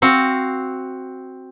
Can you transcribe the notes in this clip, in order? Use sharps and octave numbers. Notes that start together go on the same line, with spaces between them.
C4 F#4 F5